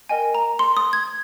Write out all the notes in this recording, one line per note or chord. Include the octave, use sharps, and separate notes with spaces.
A#4 D#5 G5 G#5
A#5
C6
D#6
G#6